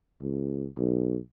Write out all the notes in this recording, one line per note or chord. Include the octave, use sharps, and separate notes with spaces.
C#2
B1